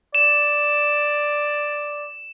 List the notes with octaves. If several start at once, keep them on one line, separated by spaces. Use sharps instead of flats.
D5 E7